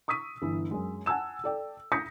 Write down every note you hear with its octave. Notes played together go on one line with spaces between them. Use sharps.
C#6 D#6 E6 B6 D#7
G1 E3
F#2 G#3
F#5 G#5 A5 E6 E7
A4 D5 G5
D#6 G6 A#6 B6 C#7